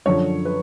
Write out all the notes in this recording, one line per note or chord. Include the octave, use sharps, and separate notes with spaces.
F#2 D3 F3 C#5
B4